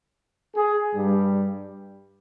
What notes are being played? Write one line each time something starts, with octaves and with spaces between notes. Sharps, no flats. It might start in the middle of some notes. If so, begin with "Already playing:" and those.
G#4
G2 G3